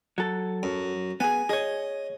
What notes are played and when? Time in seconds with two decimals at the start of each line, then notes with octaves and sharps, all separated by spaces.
0.18 F#3 A4
0.63 F#2
1.20 B3 G#4 G#5
1.49 G#4 C#5 D#5